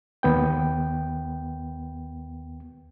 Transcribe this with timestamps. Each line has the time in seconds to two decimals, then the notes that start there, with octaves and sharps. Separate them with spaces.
0.23 D#2 B3 G5